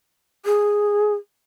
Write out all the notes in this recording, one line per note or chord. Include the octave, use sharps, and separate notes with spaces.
G#4